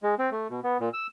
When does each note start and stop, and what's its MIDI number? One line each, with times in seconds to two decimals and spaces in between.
0.03 0.15 56
0.19 0.30 60
0.31 0.48 57
0.50 0.60 47
0.64 0.78 59
0.80 0.89 46
0.93 1.07 88